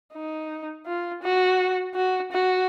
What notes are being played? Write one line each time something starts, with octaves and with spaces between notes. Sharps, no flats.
D#4
F4
F#4
F#4
F#4